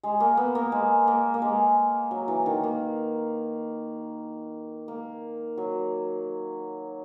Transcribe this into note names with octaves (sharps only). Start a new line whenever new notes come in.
G#3
A#3
B3
A#3
G#3
A#3
A#3
G#3
F#3
E3
D#3
A#3
A#3
F#3